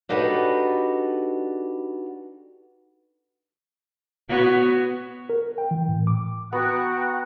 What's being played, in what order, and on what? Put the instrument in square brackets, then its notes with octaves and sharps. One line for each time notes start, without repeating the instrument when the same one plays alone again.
[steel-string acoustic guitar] D4 D#4 F#4 G4 A4 B4
[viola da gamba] B3 F#4 C#5
[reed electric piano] A#4
G5
E3
A2
D6
[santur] B3 [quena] F#4 [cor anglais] F#5 [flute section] G5 A#5 F#6